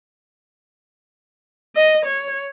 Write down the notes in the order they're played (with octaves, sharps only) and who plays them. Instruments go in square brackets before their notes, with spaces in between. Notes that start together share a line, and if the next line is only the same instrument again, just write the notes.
[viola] D#5
C#5